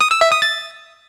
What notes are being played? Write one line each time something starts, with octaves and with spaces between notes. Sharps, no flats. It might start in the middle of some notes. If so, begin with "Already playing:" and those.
D#6
E6
E5
D#6
A6